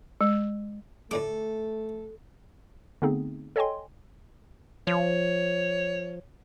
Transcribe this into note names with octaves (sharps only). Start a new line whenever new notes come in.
G#3
A2 D3 A3 A4 D6
D3 A3 B3 C4 D#4 G#4
A4 C#5 D#5 G5 G#5 C6
F3 C#5